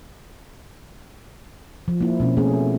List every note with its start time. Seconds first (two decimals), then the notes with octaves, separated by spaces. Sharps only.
1.88 F3
2.01 A#3 E4
2.20 B2 C4 C#4
2.37 A3 B3 C#4 G#4